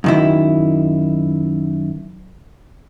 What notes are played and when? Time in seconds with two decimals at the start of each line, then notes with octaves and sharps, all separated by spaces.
0.04 F#2 D#3 E4